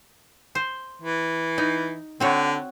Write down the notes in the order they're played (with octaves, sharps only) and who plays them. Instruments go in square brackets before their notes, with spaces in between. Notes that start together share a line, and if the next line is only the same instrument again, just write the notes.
[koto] C5
[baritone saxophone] E3
[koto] D#4
[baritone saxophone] D3 [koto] C4 F#4 C#5